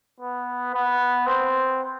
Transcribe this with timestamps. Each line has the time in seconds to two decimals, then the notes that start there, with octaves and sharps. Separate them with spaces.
0.20 B3
0.74 B3
1.27 C4